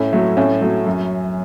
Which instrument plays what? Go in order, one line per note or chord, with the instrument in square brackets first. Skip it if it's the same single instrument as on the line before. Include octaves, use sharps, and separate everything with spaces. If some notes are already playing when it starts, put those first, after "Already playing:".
Already playing: [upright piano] A2 C#4
F#3 A3
A2 C#4
F#3 A3
F#2